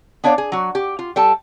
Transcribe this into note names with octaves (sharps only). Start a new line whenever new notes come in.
B3 D4 C#5 D5 F5
G#4
F#3 F#4
G4
F4
G3 A4 G5 A5